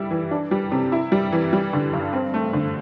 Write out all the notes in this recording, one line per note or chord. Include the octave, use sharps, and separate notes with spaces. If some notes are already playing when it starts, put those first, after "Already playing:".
Already playing: G3 E4
E3
D4
G3
C3
E4
G3
E3
G3
D3
G2
C4
A3
D3